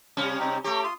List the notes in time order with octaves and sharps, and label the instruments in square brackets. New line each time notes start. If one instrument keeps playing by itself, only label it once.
[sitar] C3 G3 C#4
[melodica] C4 D#4 G4
[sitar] A3 G4 [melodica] C#5 A#5
[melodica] F4 C6 D#6